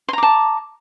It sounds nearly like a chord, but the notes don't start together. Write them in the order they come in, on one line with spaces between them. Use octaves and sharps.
C6 A#5 D6 A5